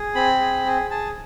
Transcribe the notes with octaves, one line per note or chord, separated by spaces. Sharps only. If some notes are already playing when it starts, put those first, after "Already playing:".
Already playing: G#4
C4 B5
G#4
G#4
G#4 A5